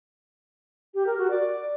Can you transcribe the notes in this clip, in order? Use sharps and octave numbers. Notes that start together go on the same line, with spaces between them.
G4
A#4
F#4
D5